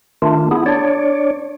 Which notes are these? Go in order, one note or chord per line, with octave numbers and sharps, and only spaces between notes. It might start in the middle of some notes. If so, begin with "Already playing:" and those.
D#3 A3 D4 F4
B3 E4 G#4
D4 C#5 D5